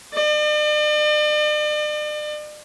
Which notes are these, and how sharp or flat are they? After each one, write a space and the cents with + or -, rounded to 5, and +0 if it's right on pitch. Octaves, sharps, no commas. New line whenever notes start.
D5 +45